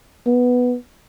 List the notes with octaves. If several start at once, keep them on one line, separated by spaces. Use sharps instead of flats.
B3